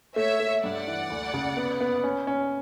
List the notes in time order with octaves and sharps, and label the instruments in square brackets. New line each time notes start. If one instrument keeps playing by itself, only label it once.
[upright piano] A3 [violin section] C#5 E5
[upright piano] A3
[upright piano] G2 [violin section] D5 F#5
[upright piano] E3
D2
C#3
B3
B3
C#4
C#4